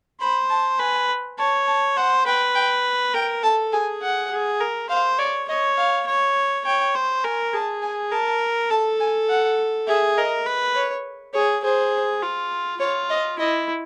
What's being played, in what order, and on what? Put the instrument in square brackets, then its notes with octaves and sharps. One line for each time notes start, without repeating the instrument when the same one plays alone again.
[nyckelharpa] C5 [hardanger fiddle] B5
[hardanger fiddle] A5
[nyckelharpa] B4 [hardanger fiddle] G#5
[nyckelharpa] C#5 [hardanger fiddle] A5
[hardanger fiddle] A5
[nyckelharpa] C5 [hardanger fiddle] F#5
[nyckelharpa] B4 [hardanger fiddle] G5
[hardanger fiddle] G5
[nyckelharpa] A#4 [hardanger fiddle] G5
[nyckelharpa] A4 [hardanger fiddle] A5
[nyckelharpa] G#4 [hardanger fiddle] G#5
[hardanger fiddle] F#5
[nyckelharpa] G#4
A#4
[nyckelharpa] C5 [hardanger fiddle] F5
[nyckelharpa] C#5 [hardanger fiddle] D5
[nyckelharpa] C#5 [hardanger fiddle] D#5
[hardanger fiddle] F5
[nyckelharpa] C#5
[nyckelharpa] C#5 [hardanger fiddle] G5
[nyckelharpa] C5
[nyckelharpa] A#4 [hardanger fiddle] G#5
[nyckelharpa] G#4 [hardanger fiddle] A5
[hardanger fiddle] G#5
[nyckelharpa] A#4 [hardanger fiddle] A5
[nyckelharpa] A4 [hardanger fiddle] A5
[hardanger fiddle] G#5
F#5
[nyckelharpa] G#4 [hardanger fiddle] E5
[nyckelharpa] A#4 [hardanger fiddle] D#5
[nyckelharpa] B4
[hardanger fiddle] C#5
[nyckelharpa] G#4 [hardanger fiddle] C#5
[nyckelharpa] G#4 [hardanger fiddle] C5
[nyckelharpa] F4
[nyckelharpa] F4 [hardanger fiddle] C#5
[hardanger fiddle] D#5
[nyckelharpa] E4 [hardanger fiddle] D#5